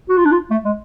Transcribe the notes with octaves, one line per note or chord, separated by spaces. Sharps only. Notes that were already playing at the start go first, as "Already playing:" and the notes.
F#4
F4
D4
F4
A3
G#3